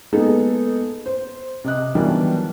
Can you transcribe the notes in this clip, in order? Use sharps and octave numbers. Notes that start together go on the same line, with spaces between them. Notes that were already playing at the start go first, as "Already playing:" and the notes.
G#3 A#3 B3 D#4 G#4 A4
C5
C3 D#5 F#6
D#3 E3 F#3 G3 B3 D4